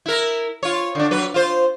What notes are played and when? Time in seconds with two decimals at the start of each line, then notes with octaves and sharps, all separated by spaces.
0.06 E4 A#4
0.63 F4 C#5
0.95 D3 D4
1.11 F#3 B4
1.34 F4 C5